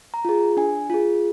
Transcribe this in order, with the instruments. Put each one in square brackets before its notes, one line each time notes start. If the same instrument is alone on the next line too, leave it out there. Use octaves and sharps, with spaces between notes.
[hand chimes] A#5
F4 G#4
D4 G#5
F4 G#4